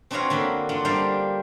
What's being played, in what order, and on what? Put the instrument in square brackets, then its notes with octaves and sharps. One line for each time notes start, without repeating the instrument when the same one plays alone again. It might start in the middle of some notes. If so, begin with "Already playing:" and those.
[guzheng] C4 D4 F#4 B4 C#5 F5
D3 A#3 B5 C6
D4 F4 F#5
G3 A#3 D4 C5 D5 F5